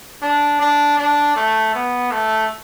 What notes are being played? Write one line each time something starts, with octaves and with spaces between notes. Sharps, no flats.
D4
D4
D4
A3
B3
A3